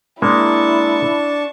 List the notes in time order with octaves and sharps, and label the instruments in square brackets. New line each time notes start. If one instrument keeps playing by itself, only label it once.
[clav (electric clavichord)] G#3 A#3 [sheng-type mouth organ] D4 A5 C#6 [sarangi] E4